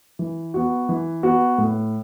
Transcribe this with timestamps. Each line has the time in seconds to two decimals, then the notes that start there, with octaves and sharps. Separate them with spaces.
0.19 E3
0.54 B3 F#4
0.89 E3
1.23 B3 F#4
1.58 A2